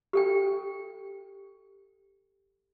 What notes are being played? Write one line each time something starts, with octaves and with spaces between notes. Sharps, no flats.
G4 A4 G5